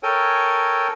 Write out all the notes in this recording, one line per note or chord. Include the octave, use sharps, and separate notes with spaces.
A4 A#4 C#5 G5 G#5